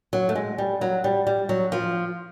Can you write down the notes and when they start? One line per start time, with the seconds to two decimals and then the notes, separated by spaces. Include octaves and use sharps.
0.13 F#3
0.29 A3
0.35 G#3
0.58 G3
0.81 F#3
1.04 G3
1.27 G3
1.49 F#3
1.72 F3